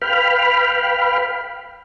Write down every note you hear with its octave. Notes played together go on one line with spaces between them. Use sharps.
B4 F5 G5 B5 F6